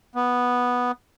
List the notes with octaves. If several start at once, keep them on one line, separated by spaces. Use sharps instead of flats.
B3